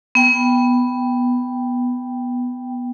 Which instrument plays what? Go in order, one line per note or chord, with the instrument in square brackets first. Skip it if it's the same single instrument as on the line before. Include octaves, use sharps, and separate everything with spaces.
[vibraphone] B3 G5